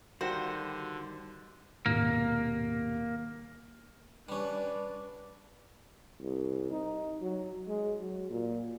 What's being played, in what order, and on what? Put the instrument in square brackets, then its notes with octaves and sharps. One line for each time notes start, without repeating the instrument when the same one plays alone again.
[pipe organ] D3 [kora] D#3 F5 [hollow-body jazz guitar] G3 F#4 [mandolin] C5
[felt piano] D#1 G#1 B2 [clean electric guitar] A#3
[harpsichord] G3 C#4 [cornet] D4 [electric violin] B4
[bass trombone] C2
D#4
F#3
G#3
F#3
A#2